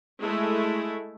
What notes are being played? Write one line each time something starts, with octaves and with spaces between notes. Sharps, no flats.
G#3 A3 E4